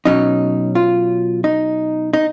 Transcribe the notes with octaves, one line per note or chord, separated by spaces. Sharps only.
B2 F#3 C#4 D#4
F4
D#4
D#4